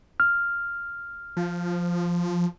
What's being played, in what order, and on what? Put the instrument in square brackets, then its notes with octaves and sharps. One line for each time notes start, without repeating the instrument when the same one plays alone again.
[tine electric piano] F6
[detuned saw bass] F3